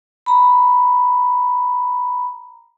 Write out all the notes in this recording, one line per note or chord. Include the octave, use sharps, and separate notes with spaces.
A#5 B5